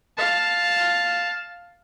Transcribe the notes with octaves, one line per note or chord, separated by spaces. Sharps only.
F5 A5